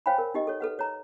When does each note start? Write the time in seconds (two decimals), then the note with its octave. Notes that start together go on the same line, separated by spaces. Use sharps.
0.06 C5 C#5 F5 G5 G#5 B5
0.18 A#4
0.34 D#4 G4 D#5
0.47 A4 C#5
0.60 A4 B4 F#5
0.79 C#5 A#5